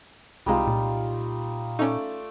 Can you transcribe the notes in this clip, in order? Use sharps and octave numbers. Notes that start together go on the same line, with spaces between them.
C2 C3 G3 G#3 D#4 F4
A#2
A3 C#4 D#4 D5